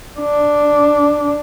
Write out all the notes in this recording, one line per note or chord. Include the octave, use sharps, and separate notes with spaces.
D4